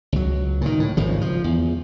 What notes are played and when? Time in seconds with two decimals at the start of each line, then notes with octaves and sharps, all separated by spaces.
0.12 C#2 F#3
0.61 A#2 D#3
0.80 A2
0.97 G#1 C#3 F3
1.21 F3
1.44 E2